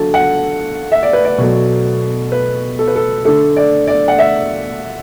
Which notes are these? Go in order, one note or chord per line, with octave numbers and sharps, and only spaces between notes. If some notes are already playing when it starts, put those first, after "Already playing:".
Already playing: D3 F#3 A3 A5
F#5
E5
D5
B4
D5
B2 F#3 A3
B4
A4
B4
A4
D3 A3 A4
D5
D5
F#5
E5